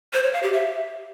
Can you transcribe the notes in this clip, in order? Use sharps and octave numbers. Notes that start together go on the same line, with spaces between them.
C5
C#5
F5
G4
E5